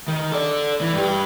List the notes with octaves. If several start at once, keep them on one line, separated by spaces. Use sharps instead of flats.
D#3
A4 D5
E3
G2 G4